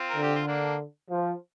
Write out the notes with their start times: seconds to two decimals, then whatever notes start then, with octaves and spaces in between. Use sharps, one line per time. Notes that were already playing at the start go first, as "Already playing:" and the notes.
Already playing: C4 F4
0.10 A#4
0.16 D3
0.22 G4
0.35 F4
0.47 A#3 D4
1.10 F3